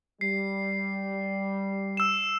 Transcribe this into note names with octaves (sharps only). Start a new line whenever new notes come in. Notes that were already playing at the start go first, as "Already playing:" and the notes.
G3 C7
E6 E7